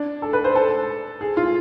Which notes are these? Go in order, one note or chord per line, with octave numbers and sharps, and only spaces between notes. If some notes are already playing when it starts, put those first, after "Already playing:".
Already playing: D4
A4
B4
C5
A4
G#4
F4